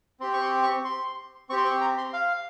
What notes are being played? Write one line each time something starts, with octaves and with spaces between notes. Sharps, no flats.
C4 G4 C6
C#6
C6
C#6
C6
C4 G4 C#6
C6
C#6
A#5
C6
F5